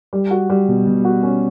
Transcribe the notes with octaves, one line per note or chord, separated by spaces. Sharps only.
G3
F#4
G3
B2
B2
F#4
C#4